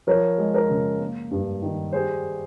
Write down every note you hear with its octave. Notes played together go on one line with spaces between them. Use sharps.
F3 A#4 C#5
G#3
A#4
C#3
A#3
G2
D#3
G3 G#4 C5